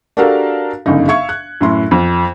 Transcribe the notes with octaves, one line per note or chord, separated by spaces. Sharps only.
D4 F#4 G4 A4 A#4 F5
G1 F#2 C#3 D#4
E5 F5 C#6 G#6 C#7
F#6
F#2 A2 C6
F2